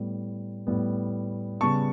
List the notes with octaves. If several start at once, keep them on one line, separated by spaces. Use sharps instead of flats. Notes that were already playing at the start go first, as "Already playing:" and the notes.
Already playing: A2 G3 B3
A2 G3 B3
C#3 G3 B3 A5 C#6